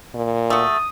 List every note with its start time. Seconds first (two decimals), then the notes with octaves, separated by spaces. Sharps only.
0.14 A#2
0.50 A3 F#4 D#6